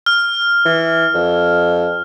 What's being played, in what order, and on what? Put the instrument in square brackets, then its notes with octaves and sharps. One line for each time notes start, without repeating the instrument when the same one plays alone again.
[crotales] F6
[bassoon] E3
F2